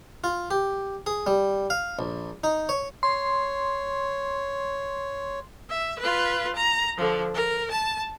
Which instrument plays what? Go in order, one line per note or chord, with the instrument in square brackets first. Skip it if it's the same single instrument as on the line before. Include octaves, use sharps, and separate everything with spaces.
[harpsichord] F4
G4
G#4
G3
F5
A#1
D#4
C#5
[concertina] C#5 [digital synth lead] C6
[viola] E5
F4 B4
A#5
D3 F3
A#4
A5